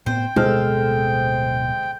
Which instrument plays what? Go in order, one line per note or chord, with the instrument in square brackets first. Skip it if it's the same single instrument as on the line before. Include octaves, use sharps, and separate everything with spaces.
[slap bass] A2 B3 C4 [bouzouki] C5 [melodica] G5
[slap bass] D1 B2 C4 [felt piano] G#3 C5 F6 [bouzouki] A4